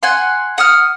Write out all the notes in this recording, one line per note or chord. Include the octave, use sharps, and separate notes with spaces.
F#5 G#5 C6
F#5 D#6 F6